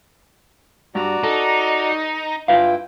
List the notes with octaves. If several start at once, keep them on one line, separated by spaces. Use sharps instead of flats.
G2 F#4 D5 A#5
D#4 A4
G2 E4 F4 B4 F5 G5